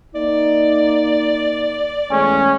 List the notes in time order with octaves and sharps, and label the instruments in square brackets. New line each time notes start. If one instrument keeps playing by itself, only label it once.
[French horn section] A#3 D#4 [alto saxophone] D5
[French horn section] E2 G#3 A3 [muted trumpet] C#4